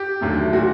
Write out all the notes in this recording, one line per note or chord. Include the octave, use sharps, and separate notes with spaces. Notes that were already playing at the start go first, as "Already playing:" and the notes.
Already playing: G4
D#2 D3 F#3 A3
A#2 A3 F#4